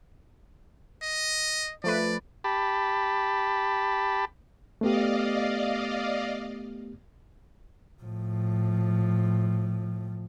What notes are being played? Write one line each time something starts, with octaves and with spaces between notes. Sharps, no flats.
D#5
F3 A3 B4 D5
G4 A5 B5
A3 B3 G4 D5 D#5 F5
A2 F3